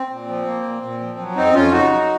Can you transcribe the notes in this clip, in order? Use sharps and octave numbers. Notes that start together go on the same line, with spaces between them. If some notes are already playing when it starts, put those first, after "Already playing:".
Already playing: C4
A#2
F3
A#3
A#2
A#2
F3
F#3
F2 C4 D#4
F2 C#4 F4
C#3 D#4 F#4
F#3